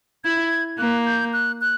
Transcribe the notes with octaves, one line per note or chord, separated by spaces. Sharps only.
E4 G#6
A#3 F#6
G6
F#6
F#6